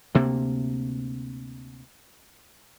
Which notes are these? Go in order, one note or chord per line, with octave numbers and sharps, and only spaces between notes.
D2 C3 A#3